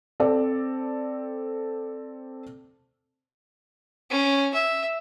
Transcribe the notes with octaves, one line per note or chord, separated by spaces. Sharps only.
C4 A4 D5
C#4
E5